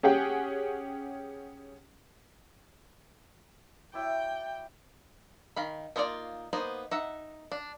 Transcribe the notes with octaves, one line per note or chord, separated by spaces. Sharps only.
C#4 G4 G#4 F#5 G5
F#3 E4 D5 G5
D#3 F5 B5
A#3 D#4 F4 A4 D5
A#3 B3 D#4 C5
D#4 E5 F#5
D4